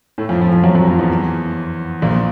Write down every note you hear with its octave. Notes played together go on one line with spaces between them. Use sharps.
A2 A3
F2 F3
F2 F3
F2 F3
F#2 F#3
F#2 F#3
F2 F3
E2 E3
A#1 A#2